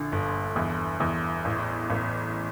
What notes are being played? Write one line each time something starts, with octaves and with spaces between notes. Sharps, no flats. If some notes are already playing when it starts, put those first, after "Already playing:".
Already playing: A#1 D3
G1
E2
E2
A1
A1